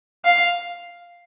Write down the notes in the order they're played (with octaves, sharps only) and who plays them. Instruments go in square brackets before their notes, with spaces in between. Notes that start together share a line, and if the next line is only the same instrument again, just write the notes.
[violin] F5